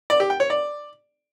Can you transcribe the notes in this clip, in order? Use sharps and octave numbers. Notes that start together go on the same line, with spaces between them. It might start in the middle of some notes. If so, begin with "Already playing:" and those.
D5
G4
G5
C#5
D5